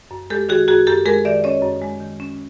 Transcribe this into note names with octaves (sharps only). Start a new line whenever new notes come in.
F#2
G#3 G4 A4
D#3 F#4 G#4
F#2 F#4 G#4
F#2 G4 A4
G#3 G#4 A#4
D#3 D5 E5
C#4 C#5 D#5
F#2
G#3
D#3
C#4